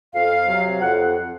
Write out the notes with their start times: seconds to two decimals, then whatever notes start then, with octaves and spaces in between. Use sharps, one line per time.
0.14 F2 F5
0.46 C3 F#3
0.81 F2 F#5